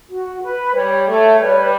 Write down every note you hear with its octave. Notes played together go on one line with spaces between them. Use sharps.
F#4
B4
G3 C#5
A3 C#5
G3 B4